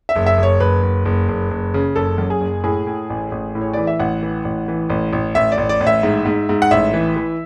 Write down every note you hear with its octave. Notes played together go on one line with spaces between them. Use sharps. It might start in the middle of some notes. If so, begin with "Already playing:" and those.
E5
F#1
E5
F#1
C#5
F#1 B4
F#1
F#1
F#1
F#1
C#3
F#1 A4
F#2
G#4
F#1
A2 G#4
A2
A1
A1
A2
C#5
E3 D5
E5
A1 F#5
E3
A1
E3
A1
A1
A1 E5
D5
A1
D5
A1
E5
G#2
G#2
G#2
F#5
A1 E5
E3
E3